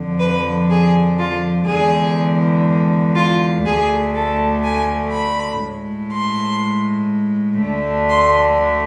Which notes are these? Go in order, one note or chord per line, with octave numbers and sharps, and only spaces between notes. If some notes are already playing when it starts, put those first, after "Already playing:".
Already playing: F2 D3 F3
B4
G#4
F4
E2 D3 G#3 G#4
F4
D2 D3 A3 G#4
A4
G#5
B5
A2 G#3
C6
D2 D3 A3
C6